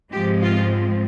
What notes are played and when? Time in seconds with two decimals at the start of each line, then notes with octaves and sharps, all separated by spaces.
0.12 G#2 F3 G#3 C4 G4
0.41 F4